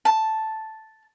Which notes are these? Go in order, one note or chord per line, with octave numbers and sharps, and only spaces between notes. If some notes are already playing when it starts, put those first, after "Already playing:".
A5